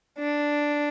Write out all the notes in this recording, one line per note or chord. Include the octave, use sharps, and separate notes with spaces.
D4